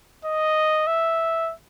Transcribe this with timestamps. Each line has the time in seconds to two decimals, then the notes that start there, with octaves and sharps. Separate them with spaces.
0.25 D#5
0.87 E5